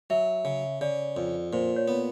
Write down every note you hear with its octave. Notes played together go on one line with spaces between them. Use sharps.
F#3 E5
C#3
C#3 D5
F2
A#2 C5
C#5
B3